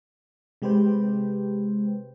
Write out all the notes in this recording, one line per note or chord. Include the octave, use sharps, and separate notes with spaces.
C3 G#3 G4 B4 C5 G5